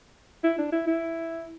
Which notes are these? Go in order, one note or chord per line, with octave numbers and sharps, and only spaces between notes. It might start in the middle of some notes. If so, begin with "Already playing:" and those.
E4
D4
E4
E4